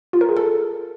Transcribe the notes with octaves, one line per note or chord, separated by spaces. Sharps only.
F4
A#4
G#4
A4